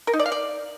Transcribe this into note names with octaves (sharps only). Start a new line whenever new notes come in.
A#4
D#4
D5
F5
D5